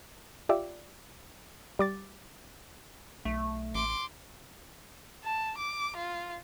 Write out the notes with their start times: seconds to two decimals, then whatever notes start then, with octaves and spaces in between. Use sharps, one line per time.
0.49 F4 G4 D5 E5
1.79 G3 D6 A6
3.25 B1 A3
3.75 A1 C6 D6
5.24 A5
5.58 D6
5.97 F4